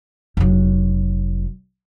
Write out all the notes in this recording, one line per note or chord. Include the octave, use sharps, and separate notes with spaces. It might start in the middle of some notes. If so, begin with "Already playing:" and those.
F1 F#3